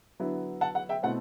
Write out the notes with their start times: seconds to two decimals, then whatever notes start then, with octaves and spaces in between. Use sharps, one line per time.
0.20 D3 F#3 B3 E4
0.61 F#5 A5
0.75 F#5
0.89 E5 G5
1.03 B2 A3 C4 E4 F#5